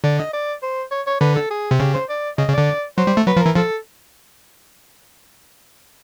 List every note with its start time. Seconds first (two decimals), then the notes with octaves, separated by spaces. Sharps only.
0.04 D3 D5
0.19 D#5
0.33 D5
0.62 C5
0.91 C#5
1.06 C#5
1.21 D3 B4
1.35 A4
1.50 G#4
1.71 C3
1.80 C#3 G4
1.94 C5
2.09 D5
2.38 C#3 D#5
2.48 C#3
2.53 D3 D5
2.98 F#3 C5
3.07 G3
3.17 A3
3.26 F#3 B4
3.37 F3
3.41 E3 A#4
3.56 F3 A4